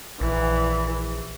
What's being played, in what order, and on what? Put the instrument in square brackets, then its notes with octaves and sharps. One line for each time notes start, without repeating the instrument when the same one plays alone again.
[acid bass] A#1 [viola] E3